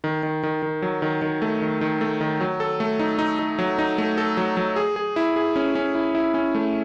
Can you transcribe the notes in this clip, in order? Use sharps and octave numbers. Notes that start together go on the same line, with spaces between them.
D#3
D#3
D#3
D#3
F#3
D#3
D#3
A3
D#3
D#3
A3
D#3
F#3
A4
A3
D#4
D#4
D#4
F#3
D#4
A3
A4
F#3
F#3
G#4
G#4
E4
G#4
C#4
C#4
E4
E4
C#4
A3